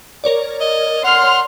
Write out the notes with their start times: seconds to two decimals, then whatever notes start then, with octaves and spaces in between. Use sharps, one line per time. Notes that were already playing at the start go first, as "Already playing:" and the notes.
0.24 A#4 C#5 D5
0.61 D#5
1.04 F#5 C6 F6